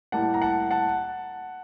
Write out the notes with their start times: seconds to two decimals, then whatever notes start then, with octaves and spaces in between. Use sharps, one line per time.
0.12 A2 G3 A#3 F#5 A5
0.34 A#5
0.42 F#5 A5
0.71 F#5 A5